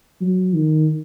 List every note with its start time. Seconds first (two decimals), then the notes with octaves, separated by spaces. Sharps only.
0.21 F#3
0.55 D#3